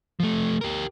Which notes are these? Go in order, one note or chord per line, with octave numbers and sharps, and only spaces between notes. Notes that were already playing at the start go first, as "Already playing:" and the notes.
F3 A3
G4 A#4